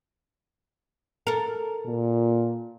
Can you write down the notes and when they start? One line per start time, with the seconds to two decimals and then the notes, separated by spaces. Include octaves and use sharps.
1.27 A4 A#4
1.86 A#2